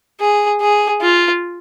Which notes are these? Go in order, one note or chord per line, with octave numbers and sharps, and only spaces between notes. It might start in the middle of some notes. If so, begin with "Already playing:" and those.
G#4
G#4
F4